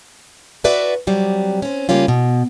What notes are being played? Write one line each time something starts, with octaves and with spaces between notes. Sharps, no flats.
F#4 A4 B4 D5 E5 F#5
C3 F#3 G3
C4 C#4
C#3 G3 A#3 C#4 F4
B2